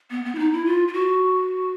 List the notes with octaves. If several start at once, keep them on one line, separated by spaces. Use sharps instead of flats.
B3
B3
E4
D#4
E4
F4
F4
F#4